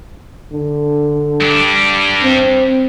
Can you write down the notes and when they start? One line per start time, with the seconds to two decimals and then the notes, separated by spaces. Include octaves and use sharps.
0.53 D3
1.41 G2 D4
2.24 C4